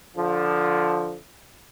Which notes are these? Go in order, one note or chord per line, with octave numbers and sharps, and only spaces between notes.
D3 F3